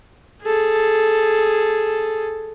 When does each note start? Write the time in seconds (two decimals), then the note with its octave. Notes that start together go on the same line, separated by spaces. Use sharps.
0.43 G#4 A4